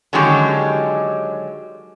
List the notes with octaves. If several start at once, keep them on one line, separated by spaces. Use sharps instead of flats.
D3 D#3 F#3 G#3 C#4 G4